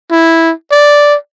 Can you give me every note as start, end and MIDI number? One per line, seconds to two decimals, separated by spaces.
0.11 0.51 64
0.71 1.15 74